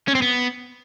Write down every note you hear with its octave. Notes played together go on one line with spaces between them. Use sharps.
C#4
C4
B3